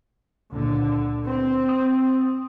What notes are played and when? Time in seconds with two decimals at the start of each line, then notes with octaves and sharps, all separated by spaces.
0.52 C#2 A#2 D3
1.25 C4
1.69 D#6